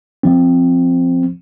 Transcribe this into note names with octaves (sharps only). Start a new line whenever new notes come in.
F3 C4